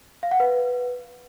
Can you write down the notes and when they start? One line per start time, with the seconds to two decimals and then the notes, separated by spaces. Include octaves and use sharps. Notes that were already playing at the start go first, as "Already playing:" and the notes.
0.23 F5
0.31 F#5
0.40 B4